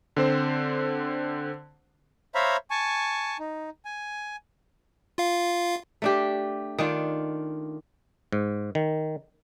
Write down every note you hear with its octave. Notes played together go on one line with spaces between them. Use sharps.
D3 C4 C5
C5 C#5 E5 F5 A#5 B5
G#5 A5 C#6
D#4
G#5
F4 F5
A3 D4 G4
D#3 D4 F4
G#2
D#3